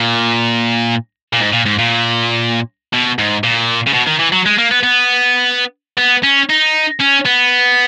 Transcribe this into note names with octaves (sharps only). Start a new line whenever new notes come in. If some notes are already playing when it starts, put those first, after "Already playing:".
Already playing: A#2
A#2
G#2
A#2
G#2
A#2
B2
G#2
A#2
C#3
B2
D#3
E3
F#3
G#3
A#3
B3
B3
B3
C#4
D#4
C#4
B3